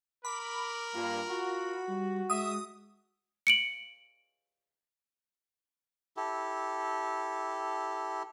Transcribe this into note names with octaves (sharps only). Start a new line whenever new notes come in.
A#4 B5 D6
G2 A#3 F4
F#4
G3
G#3 E5 D#6
C#7 D7 F#7
E4 G4 A4